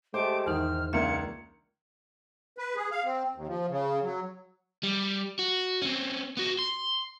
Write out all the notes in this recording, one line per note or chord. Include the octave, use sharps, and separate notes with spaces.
G#3 A3 G4 C5 D6
E2 G#2 D#3 E3 D#4 F6
C#2 D3 A#3 E5 C#7
B4
G#4
F5
C4
D#2
F3
C#3
F#3
G3
F#4
C4 C#4
B3 F#4
C6